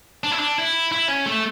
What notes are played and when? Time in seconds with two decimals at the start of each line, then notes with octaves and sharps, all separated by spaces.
0.24 D4
0.32 E4
0.39 D4
0.58 E4
0.92 E4
1.08 C#4
1.26 A3